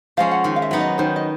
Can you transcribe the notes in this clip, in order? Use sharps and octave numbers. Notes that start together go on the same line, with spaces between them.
F3 G#3 C#4 F5
F#5
D#3
F5
E5
F#3 B3 D#4
D#5
D#3 C5
D#5